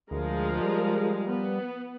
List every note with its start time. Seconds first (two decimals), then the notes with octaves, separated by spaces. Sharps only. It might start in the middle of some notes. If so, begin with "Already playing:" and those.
0.11 D2 F3 G#3 A#4
0.61 G3
1.30 B3